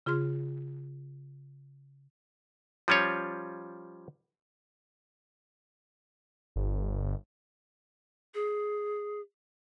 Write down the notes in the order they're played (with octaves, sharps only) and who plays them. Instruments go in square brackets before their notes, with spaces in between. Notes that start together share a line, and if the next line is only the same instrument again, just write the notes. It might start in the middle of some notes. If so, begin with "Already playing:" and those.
[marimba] C#3 F4 G#4 C6 F6
[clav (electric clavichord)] F3 G3 C#4 F4 C#5
[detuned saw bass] G1
[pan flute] G#4